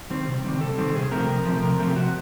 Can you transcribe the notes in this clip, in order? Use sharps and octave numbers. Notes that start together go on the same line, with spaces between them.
D#3 G3 C4
C3
D#3 G3 C4
C3 A4
D#3 G3 C4
C3 G#4
F3 A3 C4 A#4
C3
F3 A3 C4
C3 A#4
F3 A3 C4
G4
C3 F#4